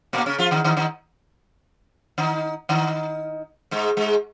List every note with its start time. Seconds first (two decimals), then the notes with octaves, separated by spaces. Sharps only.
0.13 A#2 A#3
0.26 C#3 C#4
0.39 F3 F4
0.51 D#3 D#4
0.64 D#3 D#4
0.77 D#3 D#4
2.18 D#3 D#4
2.69 D#3 D#4
3.71 G#2 G#3
3.97 G#2 G#3